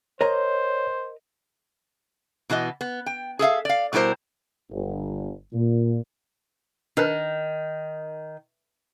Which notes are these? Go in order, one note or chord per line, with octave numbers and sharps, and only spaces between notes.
A#4 C5 C#5 D#5 A#5
B2 E3 B3 D#5
B3
G5
G#4 A4 E5 F5
D5 F5
B2 G3 E4 A#4 C5
G1
A#2
D#3 D4 A#4 B4